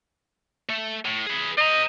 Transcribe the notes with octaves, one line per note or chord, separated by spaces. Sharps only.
A3
A2
G#4 B4
C5 D#5 A#5